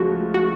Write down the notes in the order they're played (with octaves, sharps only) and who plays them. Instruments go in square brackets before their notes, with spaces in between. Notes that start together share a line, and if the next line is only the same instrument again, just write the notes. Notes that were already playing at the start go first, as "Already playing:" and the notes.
Already playing: [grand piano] C#2 C#3 F3 A3 [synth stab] F#4
[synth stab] F#4